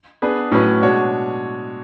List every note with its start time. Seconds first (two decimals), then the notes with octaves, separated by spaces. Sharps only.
0.22 B3 D4 G#4 B4
0.52 A2 F#3 C#4 E4 B4
0.82 B2 G#3 D4 F#4 C#5